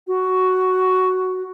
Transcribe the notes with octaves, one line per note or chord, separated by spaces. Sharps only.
F#4